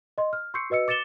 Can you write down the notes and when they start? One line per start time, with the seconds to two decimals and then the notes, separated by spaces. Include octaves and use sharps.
0.18 D#5 C6
0.33 F6
0.54 C6 C#6 E6 G6 C7 C#7
0.70 F#4 B4 D#5 E6 C#7
0.88 D6 A6 C#7 E7 G7